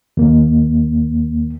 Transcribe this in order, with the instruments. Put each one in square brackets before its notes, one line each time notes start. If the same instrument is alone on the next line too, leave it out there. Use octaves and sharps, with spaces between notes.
[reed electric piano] D#2 A#3